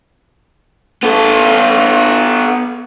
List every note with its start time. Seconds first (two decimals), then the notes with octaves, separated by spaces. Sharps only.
1.03 B3 A4